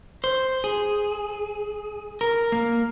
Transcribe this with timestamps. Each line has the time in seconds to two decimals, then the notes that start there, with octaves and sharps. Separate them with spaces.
0.24 C5
0.64 G#4
2.21 A#4
2.52 A#3